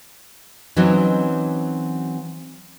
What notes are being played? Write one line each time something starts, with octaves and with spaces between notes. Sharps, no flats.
E3 F#3 C4 C#4 D#4 F#4